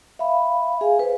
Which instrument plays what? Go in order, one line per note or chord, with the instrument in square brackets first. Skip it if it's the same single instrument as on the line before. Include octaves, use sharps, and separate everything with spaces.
[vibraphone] E5 F5 B5
G#4 F5 G#5
B4 C5